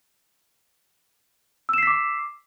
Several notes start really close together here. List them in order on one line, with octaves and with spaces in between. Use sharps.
E6 E7 C7 B6 D6